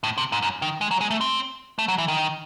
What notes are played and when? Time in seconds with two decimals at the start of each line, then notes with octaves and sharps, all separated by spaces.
0.03 A2
0.18 C3
0.32 G#2
0.42 F#2
0.62 D#3
0.81 G#3
0.91 F#3
1.01 G#3
1.11 A3
1.21 C4
1.79 A3
1.88 F#3
1.98 E3
2.08 D#3